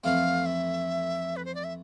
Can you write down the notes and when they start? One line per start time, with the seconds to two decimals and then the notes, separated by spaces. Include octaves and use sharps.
0.04 F2 E3 A3 C4 F5
0.46 E5
1.36 B4
1.45 C5
1.55 D5
1.64 E5